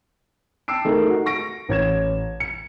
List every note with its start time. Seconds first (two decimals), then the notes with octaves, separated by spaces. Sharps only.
0.68 G5 A5 E6 C7 D7
0.85 G#3 A3 D#4 G#4 A#4
1.09 F#4
1.26 C#6 A#6 D7
1.69 A1 C#5 G#6 E7
2.40 C#7